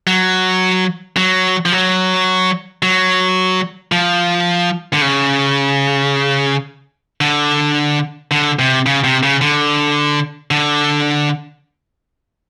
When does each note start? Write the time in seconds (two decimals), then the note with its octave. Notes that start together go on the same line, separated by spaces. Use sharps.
0.07 F#3
1.17 F#3
1.65 F3
1.72 F#3
2.83 F#3
3.92 F3
4.93 D3
5.02 C#3
7.21 D3
8.31 D3
8.59 C3
8.86 C#3
9.04 C3
9.23 C#3
9.41 D3
10.51 D3